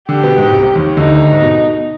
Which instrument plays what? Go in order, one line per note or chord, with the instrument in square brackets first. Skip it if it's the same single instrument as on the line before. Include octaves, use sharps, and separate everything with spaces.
[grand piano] D3 D4 [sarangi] G4
[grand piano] B2 B3
G#2 G#3
C2 C3
D#2 D#3
[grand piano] D2 D3 [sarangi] D#4
[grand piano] G#2
B2